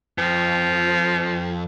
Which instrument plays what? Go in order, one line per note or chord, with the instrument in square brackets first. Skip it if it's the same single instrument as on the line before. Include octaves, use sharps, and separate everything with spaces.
[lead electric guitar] F2 [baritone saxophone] F3